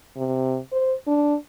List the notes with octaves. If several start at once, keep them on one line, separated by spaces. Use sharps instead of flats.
C3
C5
D4